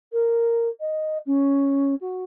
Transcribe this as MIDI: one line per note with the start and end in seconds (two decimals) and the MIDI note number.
0.12 0.68 70
0.80 1.18 75
1.26 1.94 61
2.01 2.24 66